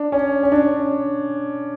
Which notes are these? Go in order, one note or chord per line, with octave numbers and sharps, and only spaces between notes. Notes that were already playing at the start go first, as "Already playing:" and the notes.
Already playing: D4
C#4
C#4
D4